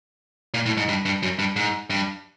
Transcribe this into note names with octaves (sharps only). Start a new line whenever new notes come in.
A#2
A2
G#2
G2
G2
F#2
G2
G#2
G2